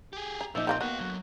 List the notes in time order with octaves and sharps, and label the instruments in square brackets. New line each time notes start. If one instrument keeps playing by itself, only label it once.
[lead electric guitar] G4 G#4
[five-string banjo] A#5
[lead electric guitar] A#2 [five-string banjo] F3 D#4 [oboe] E5
[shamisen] D#3 A#3 C4 [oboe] G5
[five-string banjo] A#3 [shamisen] B3 [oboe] F#4 [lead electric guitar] D#5 F5
[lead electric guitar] D3 F#3